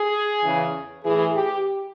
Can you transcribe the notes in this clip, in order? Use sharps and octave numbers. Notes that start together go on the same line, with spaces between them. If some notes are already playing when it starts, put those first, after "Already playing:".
Already playing: G#4
E2 C#3 E3
A2 E3 G#4
G4